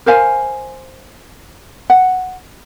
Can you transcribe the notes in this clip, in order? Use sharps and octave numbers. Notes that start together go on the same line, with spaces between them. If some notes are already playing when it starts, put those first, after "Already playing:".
A#4 C5 F5 G#5
F#5